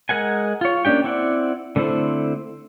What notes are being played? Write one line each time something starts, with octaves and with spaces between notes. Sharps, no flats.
G#3 A#4 F#5 G#5
F4 C#5
A#3 C#4 D4 G4 G5
C4 E4 D5 F#5
D3 A3 C4 E4 C5